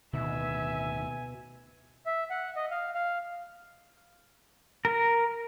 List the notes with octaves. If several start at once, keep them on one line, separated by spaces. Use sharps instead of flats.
D1 D2 B2 D#3 E5 G#5
E5
F#5
D#5
F5
F5
A#4